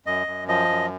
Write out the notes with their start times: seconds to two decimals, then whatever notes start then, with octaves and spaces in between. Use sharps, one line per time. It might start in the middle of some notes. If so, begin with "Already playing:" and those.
0.06 F#2 D#5
0.27 F#2
0.48 F3 D#5
0.68 F#2